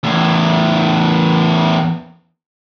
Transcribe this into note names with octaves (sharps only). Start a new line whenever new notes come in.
E2 A2